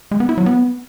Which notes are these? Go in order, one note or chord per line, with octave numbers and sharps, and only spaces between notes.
G#3
B3
E4
F#3
B3